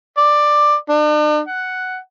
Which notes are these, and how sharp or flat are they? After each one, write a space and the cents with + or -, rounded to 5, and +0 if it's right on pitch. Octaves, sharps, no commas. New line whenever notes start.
D5 +10
D4 +45
F#5 +5